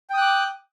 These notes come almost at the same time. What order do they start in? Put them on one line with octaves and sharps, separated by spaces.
G5 D#6 F#6 D6